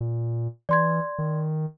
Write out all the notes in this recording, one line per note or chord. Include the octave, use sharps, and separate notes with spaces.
A#2
E3 D5 C6 G#6
D#3